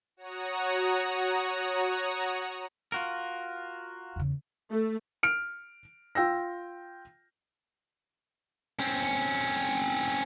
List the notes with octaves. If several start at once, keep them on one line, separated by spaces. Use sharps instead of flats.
F#4 C#5 F#5 A#5 D#6
F4 F#4 A#4
E2 C#3
A3
F6 D7
F4 G5 E6 A#6
C4 C#4